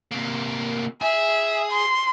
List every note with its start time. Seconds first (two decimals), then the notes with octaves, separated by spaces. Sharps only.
0.12 C3 A#3
1.01 G#4 E5
1.71 C6